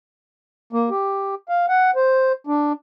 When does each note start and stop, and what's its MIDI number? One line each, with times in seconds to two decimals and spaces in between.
0.73 0.89 58
0.90 1.35 67
1.49 1.66 77
1.69 1.91 78
1.95 2.32 72
2.47 2.72 62